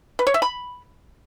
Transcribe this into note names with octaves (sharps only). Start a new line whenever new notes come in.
B4
C#5
E5
B5